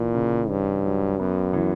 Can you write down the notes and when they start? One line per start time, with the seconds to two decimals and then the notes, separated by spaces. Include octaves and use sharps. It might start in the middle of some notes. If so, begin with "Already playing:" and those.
Already playing: A#2 E3
0.14 C#3
0.49 G2 C#4
0.85 F#3
1.19 F#2 B3
1.53 E3